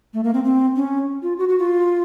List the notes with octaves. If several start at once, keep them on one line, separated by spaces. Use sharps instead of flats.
A3
A#3
C4
C4
C#4
F4
F#4
F#4
F4